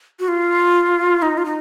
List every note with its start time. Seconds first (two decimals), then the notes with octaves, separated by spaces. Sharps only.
0.19 F#4
0.28 F4
1.22 D#4
1.37 F4
1.45 D#4